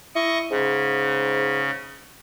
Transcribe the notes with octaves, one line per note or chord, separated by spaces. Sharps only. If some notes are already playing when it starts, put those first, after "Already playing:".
E4 D#5 C#6
G#2 C#3